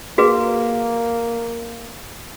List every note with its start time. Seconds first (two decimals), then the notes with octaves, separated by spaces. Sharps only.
0.18 A#3 F#4 G#4 B4